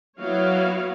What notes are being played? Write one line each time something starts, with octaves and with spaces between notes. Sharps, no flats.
F#3 B3 E4 F#4 C#5 F5